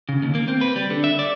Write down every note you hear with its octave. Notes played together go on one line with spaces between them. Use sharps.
C#3
D#2
A#3
C4
B4
G3
D3
E5
D5